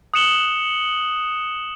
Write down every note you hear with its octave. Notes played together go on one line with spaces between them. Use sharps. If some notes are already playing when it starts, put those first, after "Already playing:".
D#6 F#6 C#7 E7 F#7 G7